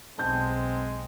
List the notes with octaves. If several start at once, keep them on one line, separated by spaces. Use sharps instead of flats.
B1 G#3 C4 A5 G6